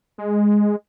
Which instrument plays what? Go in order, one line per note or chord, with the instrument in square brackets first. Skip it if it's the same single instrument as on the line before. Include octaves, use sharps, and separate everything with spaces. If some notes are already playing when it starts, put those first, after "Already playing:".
[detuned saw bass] G#3